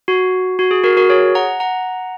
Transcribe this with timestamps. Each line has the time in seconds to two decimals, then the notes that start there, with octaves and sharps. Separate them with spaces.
0.08 F#4
0.59 F#4
0.71 G#4
0.83 F#4 A#4
0.97 F#4 A#4
1.10 G#4 C#5
1.35 F#5 A#5
1.60 F#5 A#5